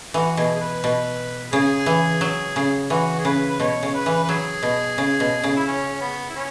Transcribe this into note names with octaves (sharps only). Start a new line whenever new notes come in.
E3 F#4
B2 G#4
G#4
B4
B2
C#3 G#4
E3
F#3
C#3
E3 F#4
G#4
C#3 B4
B4
B2 C#5
C#3
B4
E3
B4
F#3 G#4
B2
C#3
B2
C#3
E4
C#4
B3
E4
C#4